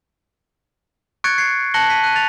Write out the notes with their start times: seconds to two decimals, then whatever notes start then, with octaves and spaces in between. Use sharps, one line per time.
1.24 C#6 F#6 G#6 A6 C#7 D7
1.38 G#6 C7 C#7
1.74 A5 F#6 A#6 C#7 F#7 G7
1.90 B6 D#7
2.04 F#6 D#7
2.16 A6 F7